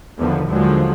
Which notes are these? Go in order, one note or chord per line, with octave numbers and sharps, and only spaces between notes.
E2 D3 D#3 F3 B3
D#2 D3 F3 F#3 G#3